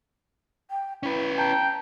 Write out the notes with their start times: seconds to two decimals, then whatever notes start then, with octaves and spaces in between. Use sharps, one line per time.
0.71 G5
1.03 C#4 E4 B4
1.38 G5 A5 A#5 G6